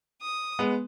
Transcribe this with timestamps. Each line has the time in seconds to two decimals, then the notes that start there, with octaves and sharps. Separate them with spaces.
0.22 D#6
0.59 G#3 B3